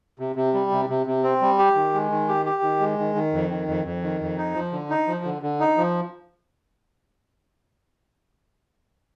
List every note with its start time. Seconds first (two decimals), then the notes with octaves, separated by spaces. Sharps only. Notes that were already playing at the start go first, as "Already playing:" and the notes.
0.19 C3
0.36 C3
0.54 G3
0.71 C3
0.89 C3
1.06 C3
1.24 C4
1.42 G3
1.59 G4
1.75 D#3
1.94 G#3
2.11 D#3
2.28 G4
2.46 G4
2.63 D#3
2.80 G#3
2.98 D#3
3.15 D#3
3.33 F2
3.50 D#3
3.68 F2
3.85 F2
4.03 D#3
4.21 F2
4.38 D#4
4.55 F3
4.73 D3
4.90 D#4
5.08 F3
5.25 D3
5.42 D3
5.60 D#4
5.77 F3